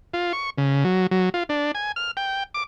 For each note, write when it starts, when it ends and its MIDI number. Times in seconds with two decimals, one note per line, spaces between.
0.14 0.33 65
0.33 0.50 85
0.58 0.84 49
0.84 1.07 54
1.11 1.29 54
1.34 1.43 65
1.49 1.72 62
1.75 1.92 80
1.96 2.11 89
2.17 2.44 79
2.54 2.64 86